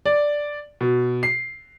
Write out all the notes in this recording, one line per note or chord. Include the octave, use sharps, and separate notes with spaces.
D5
B2
C7